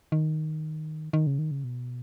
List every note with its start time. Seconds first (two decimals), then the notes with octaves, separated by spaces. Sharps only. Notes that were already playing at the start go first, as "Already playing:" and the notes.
0.12 D#3
1.13 D#3
1.27 C#3
1.39 D#3
1.51 C#3
1.64 B2